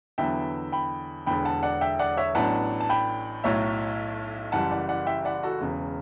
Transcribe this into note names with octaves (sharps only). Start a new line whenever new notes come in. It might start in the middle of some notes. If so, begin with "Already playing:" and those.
E2 D3 F#3 B3 E4 E5 G5
G5 B5
E1 E2 D3 G5 B5
F#5 A5
D5 F#5
E5 G5
D5 F#5
C#5 E5
A1 A2 F#3 B3 D4 F#5 A5
A5
G5 B5
B1 A2 F#3 A3 C#5 E5
F#1 F#2 E3 G3 F#5 A5
D5 F#5
D5 F#5
E5 G5
D5 F#5
F#4 A4
E1 E2 C#3